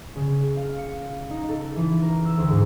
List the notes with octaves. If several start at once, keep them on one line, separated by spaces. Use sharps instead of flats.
C#3
F5
C#7
D#4
A4
E3
A#4
E6
D2
G#2